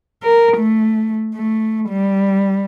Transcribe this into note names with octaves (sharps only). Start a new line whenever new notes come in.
A#4
A3
A3
G3